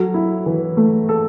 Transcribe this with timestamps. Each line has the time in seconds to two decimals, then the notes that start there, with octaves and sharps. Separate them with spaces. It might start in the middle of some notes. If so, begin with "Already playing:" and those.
Already playing: F#3 A4
0.14 E4
0.46 E3
0.77 A3
1.09 A4